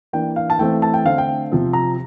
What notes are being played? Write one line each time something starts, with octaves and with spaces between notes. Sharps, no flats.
E3 A#3 D4 G5
F5
A5
E3 A3 C4 G5
A5
G5
D3 A3 C4 F5
G5
C3 F3 C4
A#5